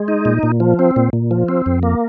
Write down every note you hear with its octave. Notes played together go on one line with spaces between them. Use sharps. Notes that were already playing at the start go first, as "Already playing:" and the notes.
Already playing: G#3
D#4
A#2
A#2
F3
C4
A#2
A#2
F3
C4
F2
A#3